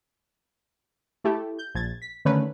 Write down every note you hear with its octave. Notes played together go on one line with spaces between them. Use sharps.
A3 E4 G4
G6
A#1 G#6 A6
B6
D3 D#3 A3 C#4 B4